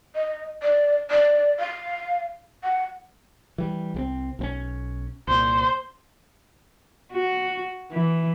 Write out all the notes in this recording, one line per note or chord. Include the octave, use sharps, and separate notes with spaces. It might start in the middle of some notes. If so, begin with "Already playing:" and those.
D#5
D5
D5
F5
F#5
E3 G3
C2 G3 C4
B1 C4 C#4
C2 A#2 C5
F#4
E3